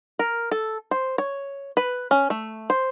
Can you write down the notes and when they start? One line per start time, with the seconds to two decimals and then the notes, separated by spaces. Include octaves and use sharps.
0.19 A#4
0.51 A4
0.91 C5
1.18 C#5
1.77 B4
2.11 C#4
2.30 A3
2.70 C5